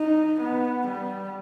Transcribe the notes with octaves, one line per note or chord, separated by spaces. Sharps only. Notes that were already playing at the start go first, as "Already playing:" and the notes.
Already playing: D#4
B3
G3